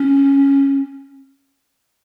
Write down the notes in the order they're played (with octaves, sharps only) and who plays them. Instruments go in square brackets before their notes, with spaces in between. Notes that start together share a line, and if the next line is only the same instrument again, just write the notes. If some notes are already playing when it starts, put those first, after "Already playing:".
Already playing: [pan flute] C#4